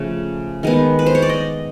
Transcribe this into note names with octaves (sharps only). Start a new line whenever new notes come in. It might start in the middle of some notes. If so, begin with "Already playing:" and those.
Already playing: C#3 F3 A3
D#3 G#3 B3
B4
C5
C#5
D5
D#5